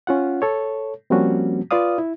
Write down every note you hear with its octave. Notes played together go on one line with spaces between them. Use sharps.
C#4 F4 F#5
A4 C#5
F3 G3 A#3 C4 C#4 F#4
F4 B4 D5 F5 D#6
E4